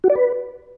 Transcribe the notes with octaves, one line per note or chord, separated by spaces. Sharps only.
F#4
D5
B4